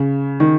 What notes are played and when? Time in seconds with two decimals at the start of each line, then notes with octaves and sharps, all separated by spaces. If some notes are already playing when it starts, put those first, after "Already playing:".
Already playing: C#3
0.40 D#3